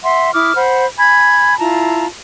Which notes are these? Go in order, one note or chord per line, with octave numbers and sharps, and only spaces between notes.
E5 F#5 C6
E4 D6 D#6 F6
C5 F#5 B5
G#5 B5 G#6
E4 F4 A5 A#5